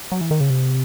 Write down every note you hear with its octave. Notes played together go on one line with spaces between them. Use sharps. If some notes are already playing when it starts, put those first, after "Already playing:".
F#3
E3
D#3
C#3
C3